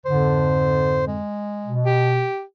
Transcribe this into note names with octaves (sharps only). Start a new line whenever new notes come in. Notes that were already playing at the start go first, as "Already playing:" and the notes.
F2 G#2 D3 C5
G#3
B2
G4